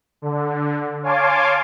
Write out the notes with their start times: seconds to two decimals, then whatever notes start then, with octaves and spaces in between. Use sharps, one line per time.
0.22 D3
1.03 C#5 F5 G#5 A5 C6 D6